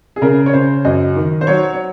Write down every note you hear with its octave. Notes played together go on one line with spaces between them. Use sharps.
G#4
C#3 A#4
C#5
C#3 C5
F#2 D#5
D#3
C5
F#3 C#5
C#5